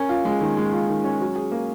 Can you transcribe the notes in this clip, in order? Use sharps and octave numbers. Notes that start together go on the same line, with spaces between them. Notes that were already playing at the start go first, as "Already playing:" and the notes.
Already playing: C#4 A#4
F4
G#3
D#3
G#3
F4
D#3
C#4
F#3
G#4
A#3